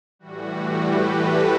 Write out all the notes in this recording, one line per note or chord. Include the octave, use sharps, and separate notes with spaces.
A2 E3 G3 F#4
G4
B4
A4